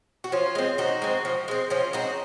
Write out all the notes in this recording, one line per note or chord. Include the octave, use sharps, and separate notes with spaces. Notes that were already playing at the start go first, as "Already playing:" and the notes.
F#4
F3 C#4 F4
G#3 C4
F3 D#4 F#4
G#3 C4
F3
G#3 C4
F3 C#4 F4
G#3 C4 D#4 F#4